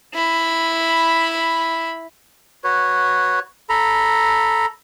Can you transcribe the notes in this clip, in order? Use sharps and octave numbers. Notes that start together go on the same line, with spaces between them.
E4 B5
F#4 B4 C#5
A4 A#5 B5